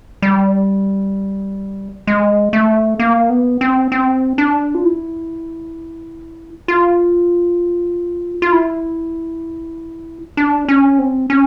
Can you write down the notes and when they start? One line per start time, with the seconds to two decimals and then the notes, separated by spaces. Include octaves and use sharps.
0.22 G3
2.07 G#3
2.53 A3
3.00 A#3
3.30 B3
3.61 C4
3.92 C4
4.38 D4
4.75 F4
4.84 E4
6.68 F4
8.42 F4
8.52 E4
10.37 D4
10.68 C#4
10.99 C4
11.30 C#4